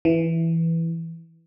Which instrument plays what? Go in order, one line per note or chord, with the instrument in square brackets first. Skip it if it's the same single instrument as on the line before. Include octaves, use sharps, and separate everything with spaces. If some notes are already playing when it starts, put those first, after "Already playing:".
[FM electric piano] E3